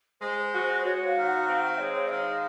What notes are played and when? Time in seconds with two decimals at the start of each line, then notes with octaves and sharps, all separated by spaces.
0.21 G#3 C5
0.43 C5
0.53 F#4
0.64 C5
0.85 F#4 C#5
1.05 F5
1.16 D#3
1.27 F#5
1.47 C4 F5
1.63 F5
1.79 G#3 C#5
1.95 C#5
2.10 D#3 F5